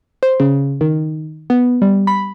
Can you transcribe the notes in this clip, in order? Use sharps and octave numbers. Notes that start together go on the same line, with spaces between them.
C5
C#3
D#3
B3
G3
B5